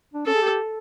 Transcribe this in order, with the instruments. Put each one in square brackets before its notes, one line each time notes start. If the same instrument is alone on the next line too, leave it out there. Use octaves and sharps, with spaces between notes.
[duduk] D4
[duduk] C#4 [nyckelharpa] A4
[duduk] G#4
G4